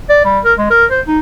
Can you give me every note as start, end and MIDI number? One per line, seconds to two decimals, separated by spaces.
0.09 0.20 74
0.25 0.39 55
0.45 0.53 70
0.58 0.68 56
0.70 0.85 70
0.91 1.01 72
1.07 1.20 63